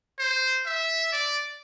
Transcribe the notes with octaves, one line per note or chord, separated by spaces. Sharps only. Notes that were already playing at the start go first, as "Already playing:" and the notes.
C5
E5
D5